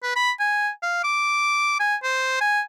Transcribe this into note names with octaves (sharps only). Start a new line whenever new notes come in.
B4
B5
G#5
F5
D6
G#5
C5
G#5